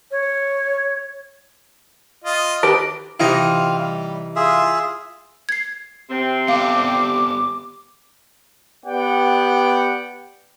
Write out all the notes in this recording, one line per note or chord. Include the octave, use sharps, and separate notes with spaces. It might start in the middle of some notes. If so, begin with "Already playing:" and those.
C#5
F4 D#5
D#3 G4 B4
C3 E3 C4 D#4 F4 F5
G3
F4 G#4 E5
G#6 C7
C3 C4
B3 G4 A4 F5 D6
B3 G4 D5 F#5 G5